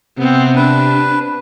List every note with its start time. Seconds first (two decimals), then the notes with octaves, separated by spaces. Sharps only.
0.18 C3 B3 C4
0.56 D4 B4